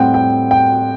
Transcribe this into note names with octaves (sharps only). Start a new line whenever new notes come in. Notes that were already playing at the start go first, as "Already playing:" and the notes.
Already playing: A2 G3 C4 F#5 G5
G5
G5